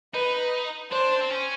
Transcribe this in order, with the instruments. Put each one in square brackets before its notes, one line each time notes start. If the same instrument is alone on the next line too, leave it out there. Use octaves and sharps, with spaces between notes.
[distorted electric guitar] D#4 [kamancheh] B4
[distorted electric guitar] D4 [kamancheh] C5
[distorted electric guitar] C4
C#4